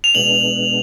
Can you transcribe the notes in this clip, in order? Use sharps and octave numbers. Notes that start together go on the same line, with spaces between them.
F7
B2 G#3 B3 D4 F#7